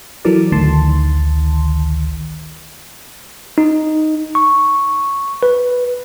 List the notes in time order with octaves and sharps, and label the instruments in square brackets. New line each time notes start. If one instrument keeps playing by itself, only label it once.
[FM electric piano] E3 F#3 A4 A#4 D5
A1 D2 D#3 A5 C6
[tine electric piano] D#4
C#6
B4